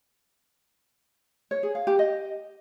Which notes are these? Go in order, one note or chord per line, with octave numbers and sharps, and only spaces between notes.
C#5
G#4
F5
G4
D#5